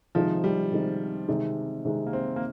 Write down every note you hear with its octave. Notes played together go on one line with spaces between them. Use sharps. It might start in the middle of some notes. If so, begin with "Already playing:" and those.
C3 D#3 F3 G#3 D#4
G3
C3 D#3 G#3 D#4
C3 D#3 G#3 D#4
C3 D#3 G#3 D#4
A#3
C4
A#3